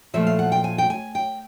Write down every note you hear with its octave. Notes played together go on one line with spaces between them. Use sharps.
A#2 F3 A3 E5
F5
F#5
G5
G#5
G5
G#5
G5